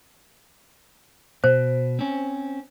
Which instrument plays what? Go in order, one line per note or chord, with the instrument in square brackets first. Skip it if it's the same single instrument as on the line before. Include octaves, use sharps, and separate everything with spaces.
[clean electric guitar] B2 [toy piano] C5
[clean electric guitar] C4 C#4